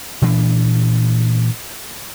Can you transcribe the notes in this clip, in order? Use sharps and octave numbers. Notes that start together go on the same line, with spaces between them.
A#2 E3 D4